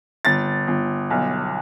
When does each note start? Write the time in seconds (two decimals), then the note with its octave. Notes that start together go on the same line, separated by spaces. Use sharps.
0.25 G1 A6
0.67 G1
1.10 B1